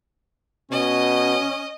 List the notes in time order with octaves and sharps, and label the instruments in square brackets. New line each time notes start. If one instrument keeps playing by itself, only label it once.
[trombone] B2 [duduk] C#4 [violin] D#5